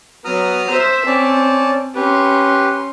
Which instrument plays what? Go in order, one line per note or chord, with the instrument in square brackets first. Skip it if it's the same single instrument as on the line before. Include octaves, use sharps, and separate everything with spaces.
[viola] F#3 B3 [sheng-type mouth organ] A#5 D#6 F6
[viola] C5 E5
[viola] C4 [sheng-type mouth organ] C#4 D5 A5
[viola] C#4 C6 [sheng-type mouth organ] G4 B4